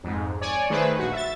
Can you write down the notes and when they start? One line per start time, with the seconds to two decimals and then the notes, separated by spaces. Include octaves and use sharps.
0.04 F2 G#2
0.41 C#5 D5 G#5
0.70 D#3 A3 G#4 B4 C5
0.99 A#1 F#4
1.13 E5 A6